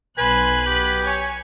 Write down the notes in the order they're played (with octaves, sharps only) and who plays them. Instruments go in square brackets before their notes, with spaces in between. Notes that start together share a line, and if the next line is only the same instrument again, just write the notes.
[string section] B1 F#6 [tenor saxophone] B4 [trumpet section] C5 B5 [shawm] G#5
[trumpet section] B3 [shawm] G4
[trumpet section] C#5 [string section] G#5